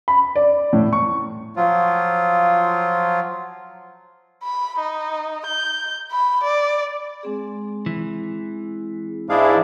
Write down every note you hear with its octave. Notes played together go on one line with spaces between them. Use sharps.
B5
D5
A2
C#6
F3 F#3 F4
B5
D#4
G6
B5
D5
G#3 C4 G#4
E3
G#2 D4 E4 G#4 F5